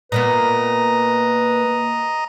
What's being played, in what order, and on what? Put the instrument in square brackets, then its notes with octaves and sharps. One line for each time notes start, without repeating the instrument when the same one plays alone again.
[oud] A#2 A#3 B3 [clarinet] B4 [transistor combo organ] D#5 A#5